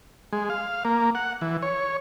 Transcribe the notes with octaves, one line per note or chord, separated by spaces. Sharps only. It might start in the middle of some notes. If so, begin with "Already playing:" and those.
G#3
F5
A#3
F#5
E3
C#5